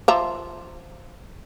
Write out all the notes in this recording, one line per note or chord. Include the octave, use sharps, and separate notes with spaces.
F3 E5 A#5